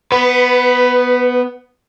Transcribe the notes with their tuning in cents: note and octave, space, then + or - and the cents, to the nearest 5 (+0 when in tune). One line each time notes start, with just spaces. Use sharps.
B3 +0 B4 +25